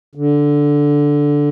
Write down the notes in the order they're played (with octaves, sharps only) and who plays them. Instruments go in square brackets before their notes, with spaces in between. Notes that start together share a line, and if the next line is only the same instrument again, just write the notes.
[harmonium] D3